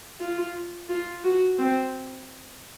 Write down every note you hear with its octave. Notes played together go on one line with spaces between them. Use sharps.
F4
F4
F#4
C4